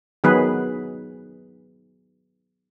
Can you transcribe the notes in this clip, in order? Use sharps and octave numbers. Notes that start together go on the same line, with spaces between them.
D#3 F#3 B3 G#4 B4